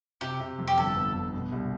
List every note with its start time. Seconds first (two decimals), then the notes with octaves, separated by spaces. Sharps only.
0.21 C3 G4
0.40 C3
0.59 F2
0.68 G4
0.77 G1 A4
0.96 B3
1.15 G1
1.34 B2
1.52 C2